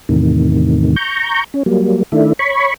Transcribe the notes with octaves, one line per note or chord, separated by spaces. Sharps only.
E2 A2 C3 D#3
A#5 C#6 G6
C#4
F#3 G3 A#3
D#3 A3 D4 E4
C#5 B5 C#6